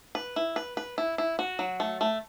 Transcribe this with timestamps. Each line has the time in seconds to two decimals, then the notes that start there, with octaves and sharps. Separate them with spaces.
0.15 B4
0.36 E4
0.56 B4
0.77 B4
0.98 E4
1.18 E4
1.39 F#4
1.59 F#3
1.80 A3
2.01 A3